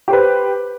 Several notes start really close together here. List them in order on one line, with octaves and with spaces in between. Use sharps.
G4 C5 B4